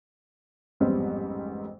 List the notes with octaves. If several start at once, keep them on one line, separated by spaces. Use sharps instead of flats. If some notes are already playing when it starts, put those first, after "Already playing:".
A1 F2 G#2 G3 B3 C4